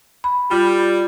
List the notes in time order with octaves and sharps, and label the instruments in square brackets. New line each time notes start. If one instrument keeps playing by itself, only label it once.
[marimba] B5
[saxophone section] G3 [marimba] F4